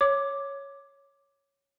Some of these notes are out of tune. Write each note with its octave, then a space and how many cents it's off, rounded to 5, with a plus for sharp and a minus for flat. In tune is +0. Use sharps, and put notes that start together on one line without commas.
C#5 +0 D6 +0